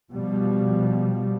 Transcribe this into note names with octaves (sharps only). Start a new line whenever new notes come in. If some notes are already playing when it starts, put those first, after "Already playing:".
B2 F3 G3